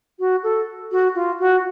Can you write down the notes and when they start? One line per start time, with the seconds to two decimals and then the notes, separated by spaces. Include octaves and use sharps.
0.20 F#4
0.43 A4
0.92 F#4
1.15 F4
1.40 F#4